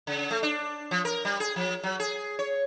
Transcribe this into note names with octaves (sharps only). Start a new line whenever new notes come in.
C#3
A3
D4
F3
A#4
G3
G#4
F3
F#3
G#4
C#5